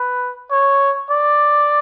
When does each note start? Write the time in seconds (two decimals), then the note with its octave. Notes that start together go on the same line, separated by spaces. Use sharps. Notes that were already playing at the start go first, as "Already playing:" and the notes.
Already playing: B4
0.51 C#5
1.10 D5